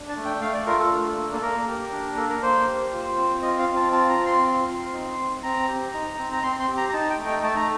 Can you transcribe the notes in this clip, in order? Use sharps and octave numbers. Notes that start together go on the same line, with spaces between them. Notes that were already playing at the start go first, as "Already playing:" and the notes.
Already playing: D4
A5
A3
G5
A3 F5
D5
F4 A#4
A4
D4
A#3
A4
A#3 A#4
G4
D4
A#3 A4
A#4
A#3 C5
G4
F4
C4
F4 D#5
F5
C4
A5
F4 A5
A#5
C4
C6
F4
C4
D#4
C4
C4 A#5
G4
D#4
C4
A#5
C4 C6
C6
G4
A#5
A#5
D#4 A5
G5
A3
G5
A3 A5
A#5